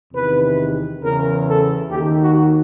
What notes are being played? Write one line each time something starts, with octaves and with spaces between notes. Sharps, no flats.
E2 C3 D#3 B4
E2 C#3 E3 A#4
A4
D#2 G4
D#3
F#4